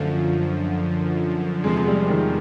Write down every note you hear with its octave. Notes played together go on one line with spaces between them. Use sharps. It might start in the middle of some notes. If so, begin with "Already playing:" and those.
Already playing: F#2 D3 F3 A3
E2 C3 F3 G#3
G#3
G3
D#3